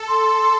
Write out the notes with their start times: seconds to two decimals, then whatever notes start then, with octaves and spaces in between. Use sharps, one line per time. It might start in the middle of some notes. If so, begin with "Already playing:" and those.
Already playing: A4
0.08 C6